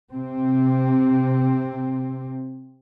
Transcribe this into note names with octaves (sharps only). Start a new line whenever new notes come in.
C3 C4